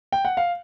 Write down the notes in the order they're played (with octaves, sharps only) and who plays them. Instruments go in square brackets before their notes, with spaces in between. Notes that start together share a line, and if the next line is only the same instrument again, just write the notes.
[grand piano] G5
F#5
F5